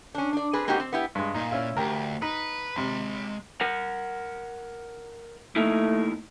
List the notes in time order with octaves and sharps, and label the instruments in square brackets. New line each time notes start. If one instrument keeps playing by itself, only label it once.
[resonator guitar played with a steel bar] C#4 D4
D4 D5
C4 G#4 B4
G#3 A#3 C4 D#4 F#4 G4
C4
B3 E4 G4
[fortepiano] G2 G#3
[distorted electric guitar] A#2 [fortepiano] D#4
[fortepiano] C#4 E4 F4
[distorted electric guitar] D2 [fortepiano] G4 A#4
[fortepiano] D#4 [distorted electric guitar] B4
[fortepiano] C3 [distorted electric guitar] G#3 B5
[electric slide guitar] A#4 F#5
[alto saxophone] A3 [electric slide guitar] A#3 D#4 E4